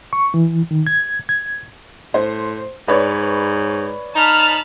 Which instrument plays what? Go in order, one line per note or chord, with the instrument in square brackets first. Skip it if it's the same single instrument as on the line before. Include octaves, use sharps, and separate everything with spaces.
[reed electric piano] C#6
E3
D#3
G#6
G#6
[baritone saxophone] A2 [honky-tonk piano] C5
[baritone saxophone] G#2 [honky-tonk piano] B4 C#5 D5
[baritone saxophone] D#4 [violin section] A5 B5 F6